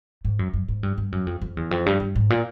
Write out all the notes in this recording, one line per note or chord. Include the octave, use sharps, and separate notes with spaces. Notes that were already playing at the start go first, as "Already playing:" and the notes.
G#2
F#2
F#2
G#2
G2
G2
F#2
F2
F2
E2
F2
G2
G2
G#2
A#2